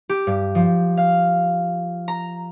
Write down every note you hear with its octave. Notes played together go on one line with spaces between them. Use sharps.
G4
G2
F3
F5
A#5